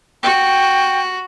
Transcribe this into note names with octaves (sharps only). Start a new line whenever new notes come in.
F#4 G5